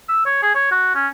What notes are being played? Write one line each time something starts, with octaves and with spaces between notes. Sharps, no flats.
E6
C#5
G#4
C#5
F#4
C#4